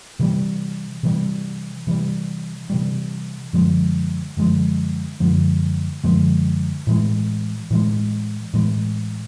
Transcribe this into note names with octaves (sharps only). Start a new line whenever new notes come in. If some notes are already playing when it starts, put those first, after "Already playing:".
C3 E3 G3
C3 E3 G3
C3 E3 G3
C3 E3 G3
F#2 D3 F3 G#3
F#2 D3 F3 G#3
F#2 D3 F3 G#3
F#2 D3 F3 G#3
A2 E3 G#3
A2 E3 G#3
A2 E3 G#3